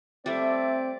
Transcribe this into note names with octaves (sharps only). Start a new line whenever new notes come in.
G3 A3 C4 D5 E5